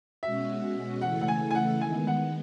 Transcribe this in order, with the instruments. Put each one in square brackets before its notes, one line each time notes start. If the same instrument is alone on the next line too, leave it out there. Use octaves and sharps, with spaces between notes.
[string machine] B2 G#3 C#4 F#4 [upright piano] E5
[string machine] C#3 E3 A3 E4 A4 [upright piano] F#5
[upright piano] F#5
G#5
G#5
F#5
[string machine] D#3 G#3 B3 [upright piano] G#5
[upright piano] F#5